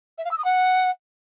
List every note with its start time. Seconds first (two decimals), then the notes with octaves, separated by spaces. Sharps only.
0.18 E5
0.25 F5
0.31 E6
0.38 D#6
0.45 F#5